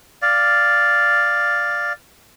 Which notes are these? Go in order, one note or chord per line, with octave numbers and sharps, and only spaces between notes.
D5 F5